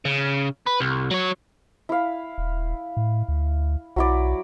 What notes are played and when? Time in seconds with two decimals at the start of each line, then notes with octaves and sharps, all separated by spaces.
0.05 C#3
0.67 B4
0.81 C2
1.11 F#3 C#5
1.89 E4 F5
2.38 D#1
2.97 A2
3.28 D2
3.96 B1 F#3 E4 D5